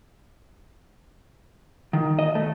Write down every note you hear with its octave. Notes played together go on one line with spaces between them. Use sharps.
D#3
D#5
A3